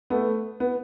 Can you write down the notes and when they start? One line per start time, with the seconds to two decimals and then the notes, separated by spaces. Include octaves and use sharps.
0.10 A3 B3
0.60 B3